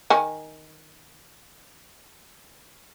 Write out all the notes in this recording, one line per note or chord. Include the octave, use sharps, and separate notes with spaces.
D#3 G#5